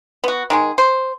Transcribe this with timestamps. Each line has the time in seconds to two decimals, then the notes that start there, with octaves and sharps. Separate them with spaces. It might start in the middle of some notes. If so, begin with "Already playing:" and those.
0.24 B3 F#4
0.50 D#3 G#3 G#4
0.78 C5